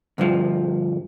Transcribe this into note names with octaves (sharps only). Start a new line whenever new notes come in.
D2 G2 F3